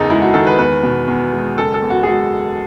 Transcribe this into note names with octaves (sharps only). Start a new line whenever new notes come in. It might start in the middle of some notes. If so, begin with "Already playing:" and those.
Already playing: F#1 E2 C#3 D#4 G#4 A4
G#3 E4
F#4
D#3 A4
B4
E2 B4
B2
E2
G#3
F#1 A4
A4
E2
F#4
G#4
G#3 F#4